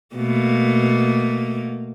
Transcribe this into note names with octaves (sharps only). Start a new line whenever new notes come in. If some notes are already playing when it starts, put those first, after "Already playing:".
B2 A3 A#3